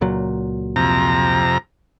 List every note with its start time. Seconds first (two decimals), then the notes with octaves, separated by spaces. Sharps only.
0.01 C#2 A#2 F#3
0.76 F2 C3 A#5